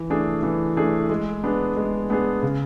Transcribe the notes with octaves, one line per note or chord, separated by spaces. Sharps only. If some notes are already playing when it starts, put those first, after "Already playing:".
Already playing: E3
A3 D4 G#4
E3
A3 D4 G#4
G#3
B3 D4 G#4
G#3
B3 D4 G#4
C#3